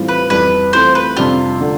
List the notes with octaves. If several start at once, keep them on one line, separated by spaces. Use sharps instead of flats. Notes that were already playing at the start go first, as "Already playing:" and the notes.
Already playing: A2 E3 G3 C4 F4
B4
F2 E3 G3 B4
E3 A3 C4 F4 C5
B4
F2 C3 G3 D4 F4
D3 A3 D4